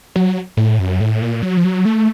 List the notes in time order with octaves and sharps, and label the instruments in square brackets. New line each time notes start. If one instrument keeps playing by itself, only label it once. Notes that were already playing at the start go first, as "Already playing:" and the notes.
[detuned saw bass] F#3
A2
F#2
A2
A#2
F#3
F3
F#3
A3